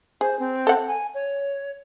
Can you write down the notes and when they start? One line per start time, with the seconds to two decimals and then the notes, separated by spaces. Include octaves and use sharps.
0.21 G#4 C5
0.39 C4
0.67 A4 F#5
0.88 G#5
1.14 C#5